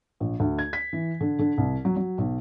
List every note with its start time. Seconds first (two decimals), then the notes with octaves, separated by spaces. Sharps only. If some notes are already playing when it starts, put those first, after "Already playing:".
0.20 A#1
0.40 D2
0.58 G#6
0.73 B6
0.93 E3
1.21 D3
1.39 D3
1.58 C2
1.85 F#3
1.96 F#3
2.18 B1